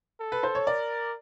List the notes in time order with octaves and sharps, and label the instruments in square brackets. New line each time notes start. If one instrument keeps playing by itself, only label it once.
[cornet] A4
[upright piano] B4
C5
C#5
[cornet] A#4 [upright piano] D5